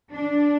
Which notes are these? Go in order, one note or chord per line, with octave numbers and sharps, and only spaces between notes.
D4